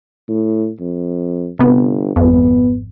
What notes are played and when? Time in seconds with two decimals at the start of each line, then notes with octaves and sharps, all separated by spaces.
0.28 A2
0.80 F2
1.59 G1 C3 B3
2.16 G#1 F2 B3